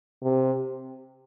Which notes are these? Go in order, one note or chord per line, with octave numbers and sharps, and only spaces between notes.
C3